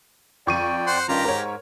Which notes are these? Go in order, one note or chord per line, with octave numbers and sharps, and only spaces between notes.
F2 D5 G5 C#6 D#7
C5 F#5 C6
G2 D#3 C#4 F4 G4 A#5
G#2 A#4 C#5